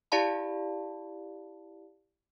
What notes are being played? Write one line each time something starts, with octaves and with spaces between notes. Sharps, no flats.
E4 G4 D5 F5 A5 B5